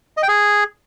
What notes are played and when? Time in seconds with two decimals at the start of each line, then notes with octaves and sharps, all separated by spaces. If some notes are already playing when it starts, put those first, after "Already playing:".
0.17 D#5
0.23 G5
0.28 G#4